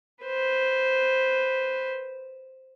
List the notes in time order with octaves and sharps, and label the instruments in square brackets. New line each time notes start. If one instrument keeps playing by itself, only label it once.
[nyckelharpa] B4 C5